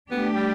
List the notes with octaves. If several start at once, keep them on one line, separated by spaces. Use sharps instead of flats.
A3 B3 D4 G4
G3